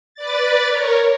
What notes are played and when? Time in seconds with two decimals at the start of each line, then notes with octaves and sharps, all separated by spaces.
0.15 B4 D5 A6
0.69 A#4 C#5